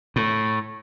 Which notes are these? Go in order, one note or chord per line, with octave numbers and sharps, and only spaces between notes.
A2